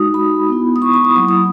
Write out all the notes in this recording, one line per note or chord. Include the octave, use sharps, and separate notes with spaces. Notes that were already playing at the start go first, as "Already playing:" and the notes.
Already playing: G#3 D#4 F#4 D#6
B5
B3 E4
D#6
C#6
B5
D#6
F#3 A#3 E4 D#6
D#6